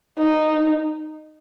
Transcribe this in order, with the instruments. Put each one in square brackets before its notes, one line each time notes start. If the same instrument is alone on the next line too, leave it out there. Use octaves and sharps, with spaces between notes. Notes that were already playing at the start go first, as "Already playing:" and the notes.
[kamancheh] D#4